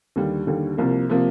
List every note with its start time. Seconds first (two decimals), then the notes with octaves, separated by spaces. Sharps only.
0.16 D#2 D3 G3
0.47 D#2 D3 G3
0.78 C2 C3 F3 A#3
1.09 C3 F3 A#3